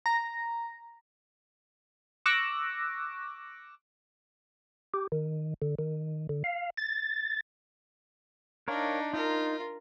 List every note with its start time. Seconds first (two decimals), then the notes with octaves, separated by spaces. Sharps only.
0.06 A#5
2.26 C#6 D6 E6 F#6 A#6
4.94 G4
5.12 D#3
5.62 D3
5.79 D#3
6.29 D3
6.44 F5
6.77 A6
8.68 D4 D#4 A#4 C#5 F5
9.14 D#4 F4 A#4